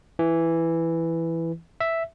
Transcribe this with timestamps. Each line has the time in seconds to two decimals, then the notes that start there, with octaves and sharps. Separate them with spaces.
0.19 E3
1.80 E5